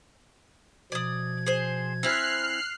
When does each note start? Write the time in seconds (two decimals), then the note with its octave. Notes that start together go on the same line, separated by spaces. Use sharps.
0.92 B2 F3 D5 D#6 G#6
1.46 G#4 C5
2.03 C4 E4 G#5 F6 F#6 C7